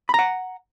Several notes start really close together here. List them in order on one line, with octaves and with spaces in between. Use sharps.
B5 A#5 F#5